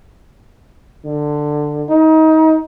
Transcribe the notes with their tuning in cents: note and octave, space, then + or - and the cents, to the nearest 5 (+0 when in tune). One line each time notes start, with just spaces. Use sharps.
D3 +15
D#4 +30